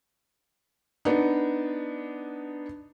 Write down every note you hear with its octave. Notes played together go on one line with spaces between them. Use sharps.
B3 D4 D#4